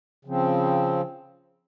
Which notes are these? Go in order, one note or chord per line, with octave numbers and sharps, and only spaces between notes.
C#3 F3 C4